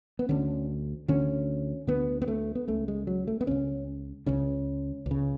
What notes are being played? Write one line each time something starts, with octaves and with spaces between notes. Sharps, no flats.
B3
D2 D3 C#4
D2 D3 C#4
D2 D3 B3
B3
A3
B3
C#2 C#3 A3
G#3
F#3
A3
B3
C#2 C#3 C#4
C#2 C#3 C#4
C#2
C#3